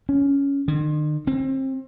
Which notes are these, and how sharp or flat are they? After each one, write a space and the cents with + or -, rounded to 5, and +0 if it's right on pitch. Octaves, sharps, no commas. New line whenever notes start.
C#4 +10
D#3 -45
C4 +30